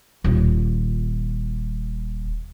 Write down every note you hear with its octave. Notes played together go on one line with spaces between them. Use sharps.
D#1 F4